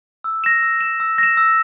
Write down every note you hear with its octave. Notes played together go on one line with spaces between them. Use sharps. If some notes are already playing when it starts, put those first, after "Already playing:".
E6
A#6 E7
E6
A#6 E7
E6
A#6 E7
E6